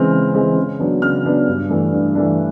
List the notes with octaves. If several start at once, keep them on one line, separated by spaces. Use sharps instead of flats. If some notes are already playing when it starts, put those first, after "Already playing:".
Already playing: C#3 E3 G#3 C4 F6
C#3
E3 G#3 C4
C#3
F#3 B3 D4
C#3 F6
F#3 B3 D4
G2
E3 A3 D4
G2
E3 A3 D4